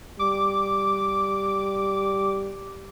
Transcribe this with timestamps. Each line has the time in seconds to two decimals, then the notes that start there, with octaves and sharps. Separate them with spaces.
0.19 G3 D6